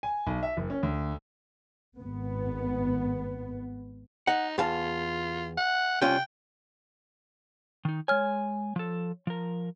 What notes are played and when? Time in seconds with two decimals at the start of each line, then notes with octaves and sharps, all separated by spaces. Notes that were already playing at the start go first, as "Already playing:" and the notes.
0.03 G#5
0.27 B1
0.43 E5
0.57 F#1
0.70 C#4
0.83 D2
1.98 G#1 B3
4.27 D#4 F#5
4.58 E2 F4 F5 A5
5.57 F#5
6.01 C2 C#4 F4 G5
7.85 D#3 D#4
8.08 G#3 C#5 G#5 F6
8.76 F3 A4
9.27 F3 A#4